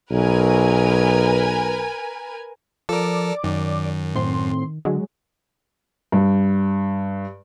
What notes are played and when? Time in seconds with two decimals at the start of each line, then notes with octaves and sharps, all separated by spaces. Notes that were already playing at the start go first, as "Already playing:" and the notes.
0.11 B1 A#4 B4 G#5
2.89 F3 A4 A#4 D5 D6
3.44 F#2 D#3
4.15 A2 C4 C6
4.85 D3 F#3 G#3
6.12 G2